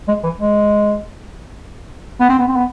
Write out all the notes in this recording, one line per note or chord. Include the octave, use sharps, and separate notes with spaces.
G#3
E3
G#3
B3
C4
B3
C4
B3